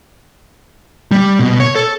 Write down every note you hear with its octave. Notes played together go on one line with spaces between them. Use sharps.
G3
B2
C#5
A4